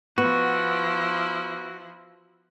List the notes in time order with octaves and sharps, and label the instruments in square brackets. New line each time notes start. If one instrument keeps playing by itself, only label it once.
[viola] F3 E4 [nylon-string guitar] B3 [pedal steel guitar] F#4